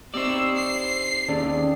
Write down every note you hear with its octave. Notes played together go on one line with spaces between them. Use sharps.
C4 D#4 G4 C5 D5 E6
C7
D#2 C#4 G#4 A4 D5